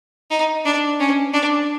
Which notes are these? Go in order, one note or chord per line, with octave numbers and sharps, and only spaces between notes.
D#4
D4
C#4
D4